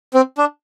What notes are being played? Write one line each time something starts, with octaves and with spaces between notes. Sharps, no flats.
C4
D4